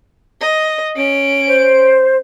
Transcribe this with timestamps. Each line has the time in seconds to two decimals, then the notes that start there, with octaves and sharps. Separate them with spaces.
0.41 D#5
0.96 C#4 D7
1.47 C5